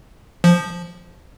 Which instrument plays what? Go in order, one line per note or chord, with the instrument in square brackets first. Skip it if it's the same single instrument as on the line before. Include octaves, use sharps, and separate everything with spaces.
[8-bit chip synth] F3